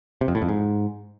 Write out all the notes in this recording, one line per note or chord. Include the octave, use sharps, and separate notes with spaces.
C3
F2
A2
F2
G#2